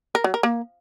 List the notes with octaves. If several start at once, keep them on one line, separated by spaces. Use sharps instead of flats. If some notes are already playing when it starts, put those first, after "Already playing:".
A#4
F#3
A#4
A#3